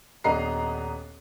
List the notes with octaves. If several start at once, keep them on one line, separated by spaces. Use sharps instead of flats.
D#1 B3 D4 D#5 A#5 C7